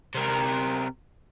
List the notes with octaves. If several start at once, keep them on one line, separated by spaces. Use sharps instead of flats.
C3 A#4